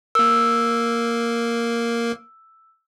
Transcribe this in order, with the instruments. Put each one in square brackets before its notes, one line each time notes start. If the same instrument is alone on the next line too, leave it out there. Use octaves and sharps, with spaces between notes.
[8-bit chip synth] A#3 A#4 [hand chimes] E6